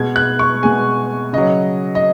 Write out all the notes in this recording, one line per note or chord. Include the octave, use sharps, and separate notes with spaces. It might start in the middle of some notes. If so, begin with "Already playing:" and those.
Already playing: B2 G#3 G#6
F#6
C#6
B2 G#3 G#5
C#3 F#3 D#5
D#5